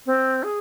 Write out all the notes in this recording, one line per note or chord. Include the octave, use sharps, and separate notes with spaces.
C4
G#4